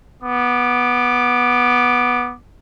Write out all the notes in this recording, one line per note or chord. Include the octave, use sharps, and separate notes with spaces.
B3 D6